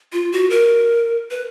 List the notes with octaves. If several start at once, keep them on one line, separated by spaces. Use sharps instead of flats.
F4
F#4
A#4
B4